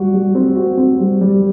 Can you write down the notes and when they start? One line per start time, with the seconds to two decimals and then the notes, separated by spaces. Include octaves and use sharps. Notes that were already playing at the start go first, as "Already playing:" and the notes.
Already playing: G3 F#4
0.14 G3
0.35 C4
0.56 F#4
0.77 C4
1.00 G3
1.21 G3